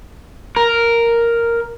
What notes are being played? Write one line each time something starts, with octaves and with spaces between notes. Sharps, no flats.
A#4